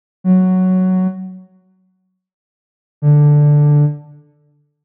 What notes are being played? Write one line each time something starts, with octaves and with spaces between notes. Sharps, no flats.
F#3
D3